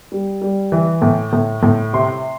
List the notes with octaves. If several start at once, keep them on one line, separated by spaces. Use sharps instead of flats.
G3
G3
E3
A2
A2
A2
C3 C6